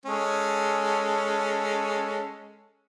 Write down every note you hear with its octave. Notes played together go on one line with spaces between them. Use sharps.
G#3 C#4 A4